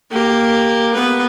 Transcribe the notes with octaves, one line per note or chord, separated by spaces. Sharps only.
A#3 G4
B3 B4